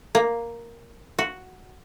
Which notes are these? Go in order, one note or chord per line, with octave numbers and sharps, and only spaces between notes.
A#3
F#4